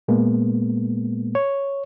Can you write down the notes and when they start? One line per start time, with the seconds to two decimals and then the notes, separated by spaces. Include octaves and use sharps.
0.08 A#2 G#3 A#3 B3
1.35 C#5